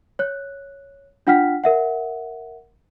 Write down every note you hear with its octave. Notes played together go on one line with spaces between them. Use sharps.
C#5 F#6
D4 F4 F#5 G5 F6 B6
A#4 E5 F#5